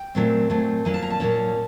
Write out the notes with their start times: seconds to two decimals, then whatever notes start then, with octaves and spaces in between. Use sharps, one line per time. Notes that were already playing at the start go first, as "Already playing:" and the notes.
Already playing: G5
0.15 A#2 F#3 A3 C4
0.50 A#2 F#3 A3 C4
0.85 A#2 F#3 A#3 C#4 G#5
0.94 A5
1.02 A#5
1.10 A5
1.20 A#2 F#3 A#3 C#4